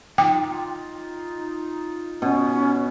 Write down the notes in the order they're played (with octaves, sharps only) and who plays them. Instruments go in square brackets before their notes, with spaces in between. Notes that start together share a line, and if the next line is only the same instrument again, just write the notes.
[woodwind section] D#4 F4 [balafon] G5
[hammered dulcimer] B2 [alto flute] C#4